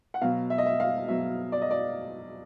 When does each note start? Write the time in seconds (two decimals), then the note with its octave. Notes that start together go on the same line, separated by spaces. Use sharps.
0.14 F#5
0.21 B2 F#3 F5
0.50 E5
0.58 D#5
0.66 E5
0.80 F5
1.08 B2 F#3 E5
1.52 D5
1.62 D#5
1.71 D5